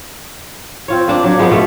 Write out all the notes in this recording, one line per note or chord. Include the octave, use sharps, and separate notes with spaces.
C4 F4 C#5
A#3 D4
F#3 D4
F3 G#3 B3
B2 A3